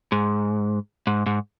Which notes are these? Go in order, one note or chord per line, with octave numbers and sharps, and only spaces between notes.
G#2
G#2
G#2